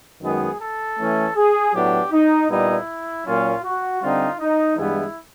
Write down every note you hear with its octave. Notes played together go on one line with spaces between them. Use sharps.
F#2 D#3 G#3 B3 G#4
A4
E3 A3 C#4
G#4
A2 F#3 B3 D4 G4
D#4
A#2 G3 B3 D#4 E4
A#2 F#3 A#3 C#4 F4
F#4
D3 G3 C4 D#4 F4
D#4
G2 E3 G#3 B3 E4